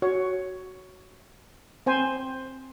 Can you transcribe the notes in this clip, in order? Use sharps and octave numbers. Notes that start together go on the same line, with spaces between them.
F#4 C#5
C4 C5 G#5